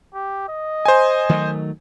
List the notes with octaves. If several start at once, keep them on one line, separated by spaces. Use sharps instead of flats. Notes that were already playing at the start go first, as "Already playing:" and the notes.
G4
D#5
C5 G#5
D#3 F#3 A3